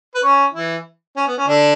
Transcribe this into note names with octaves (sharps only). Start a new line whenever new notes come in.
B4
C#4 C#5
E3 E4
C#4
B3
C#4
D3 D4